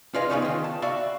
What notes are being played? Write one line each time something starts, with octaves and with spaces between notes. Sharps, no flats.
F4 G#4 B4 D5 D#5 F5
G#3 A3 B3 C#4 D#4 F4
D#3 F4
A5
F#4 D5 E5 F5 B5